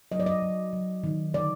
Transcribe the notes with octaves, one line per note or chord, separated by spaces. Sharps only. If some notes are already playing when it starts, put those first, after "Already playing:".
F#3 D#5
D5
D#5
F#3
F#3
D#3
D3 D5